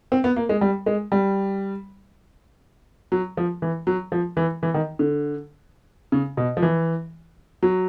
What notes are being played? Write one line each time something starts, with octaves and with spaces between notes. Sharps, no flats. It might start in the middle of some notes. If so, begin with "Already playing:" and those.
C4
B3
A#3
G#3
G3
G#3
G3
F#3
F3
E3
F#3
F3
E3
E3
D#3
D3
C#3
B2
F3
E3
F#3